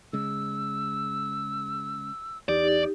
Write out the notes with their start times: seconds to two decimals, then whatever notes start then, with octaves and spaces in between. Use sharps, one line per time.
0.13 C#3 G#3 E6
2.49 E2 D#4 G4 D5